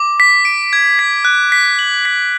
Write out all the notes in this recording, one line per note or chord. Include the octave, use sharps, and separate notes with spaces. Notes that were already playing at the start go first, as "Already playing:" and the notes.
Already playing: D6
B6
D7
G#6
B6
F#6
B6
F#7
B6